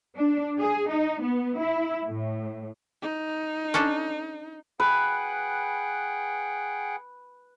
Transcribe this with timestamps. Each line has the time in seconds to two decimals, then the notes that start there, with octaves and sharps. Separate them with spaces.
0.17 D4
0.60 G#4
0.90 D#4
1.22 B3
1.58 E4
2.04 A2
3.02 D#4
3.74 C#4 D4 A4
4.80 G#4 B4 F#5 G5